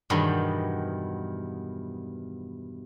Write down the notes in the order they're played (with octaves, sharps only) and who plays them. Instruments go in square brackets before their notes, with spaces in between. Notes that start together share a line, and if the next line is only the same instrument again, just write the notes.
[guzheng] E2 G2 B2 D#3 F#3 G3